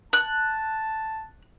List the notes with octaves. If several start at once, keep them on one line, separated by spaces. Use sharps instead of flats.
A5 F#6